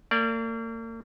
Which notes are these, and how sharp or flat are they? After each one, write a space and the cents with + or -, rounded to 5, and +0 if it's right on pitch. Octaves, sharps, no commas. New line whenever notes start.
A#3 -40 D5 -15